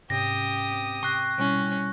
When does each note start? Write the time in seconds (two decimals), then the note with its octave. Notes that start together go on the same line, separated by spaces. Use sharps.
0.10 G#2 C3 C#4 G4 D#6 A#6
0.71 C4
1.03 C3 G5 C#6 F#6 A#6 C7
1.38 B2 G3 C#4 E4